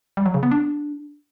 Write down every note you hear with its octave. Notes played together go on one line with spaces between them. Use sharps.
G3
F#3
C#3
B3
D4